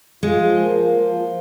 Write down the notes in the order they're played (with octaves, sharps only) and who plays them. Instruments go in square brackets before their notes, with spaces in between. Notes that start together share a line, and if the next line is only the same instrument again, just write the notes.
[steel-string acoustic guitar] G#3 [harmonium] F4
[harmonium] F3
A#3
F3
F4
F3